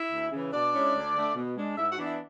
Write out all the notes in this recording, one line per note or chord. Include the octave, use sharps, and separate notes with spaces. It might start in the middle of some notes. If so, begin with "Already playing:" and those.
Already playing: E4 E5
D2
C#3 E3
B2 D4 D5
G#3 C#4 E4
D2
D3 A3 D4
B2
G#3 D4
G#2 E4 E5
F#4 F#5
E3 B3 D4
E4 E5